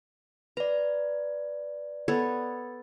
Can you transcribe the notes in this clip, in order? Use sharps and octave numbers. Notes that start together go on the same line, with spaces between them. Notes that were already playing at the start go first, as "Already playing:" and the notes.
B4 D5 A#5
B3 A4 C#5